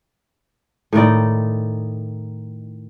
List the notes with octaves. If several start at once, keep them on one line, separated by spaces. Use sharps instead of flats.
A2 D#3 D#4 D5